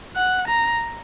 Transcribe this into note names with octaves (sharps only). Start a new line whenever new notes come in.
F#5
A#5